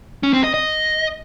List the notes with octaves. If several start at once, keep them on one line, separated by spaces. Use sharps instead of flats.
C#4
C4
D#5
D#5